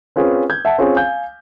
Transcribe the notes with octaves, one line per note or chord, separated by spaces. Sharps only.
C4 C#4 F4 G#4 B4
G6 G#6
E5 F#5 A5
C4 C#4 F4 G#4
F5 G#5 G6